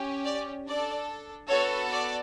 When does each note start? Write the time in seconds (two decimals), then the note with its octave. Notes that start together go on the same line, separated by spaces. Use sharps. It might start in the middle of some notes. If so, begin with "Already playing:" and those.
Already playing: C#4 G4
0.24 D5
0.67 D4 A4 D5
1.49 B3 F#4 A4 C#5
1.90 D5